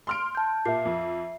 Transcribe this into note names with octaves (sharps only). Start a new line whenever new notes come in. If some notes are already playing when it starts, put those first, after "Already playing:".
C6 F6 D7
A5 G6
A#2 E5 C7
F2